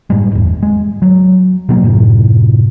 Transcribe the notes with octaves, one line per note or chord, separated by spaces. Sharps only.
F#1 G#2 G3 G#3
G1 E2
G#3
F#3
B2 F#3 A#3
F#2 A2 C3